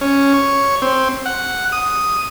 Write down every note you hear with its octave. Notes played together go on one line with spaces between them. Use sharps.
C#4
C#5
C4
F#5
D#6